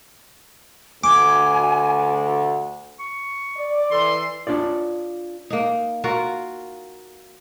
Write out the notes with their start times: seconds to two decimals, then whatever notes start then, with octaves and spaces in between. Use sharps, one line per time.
1.04 D2 G#5 D6
2.99 C#6
3.56 D5
3.91 E3 A4 C6
4.47 D4 F4 C#5 D5
5.50 A#3 D#4
6.04 F4 F#4 A#4